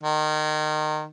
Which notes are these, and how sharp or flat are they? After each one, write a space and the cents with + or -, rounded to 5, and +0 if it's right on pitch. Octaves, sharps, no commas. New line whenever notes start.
D#3 -25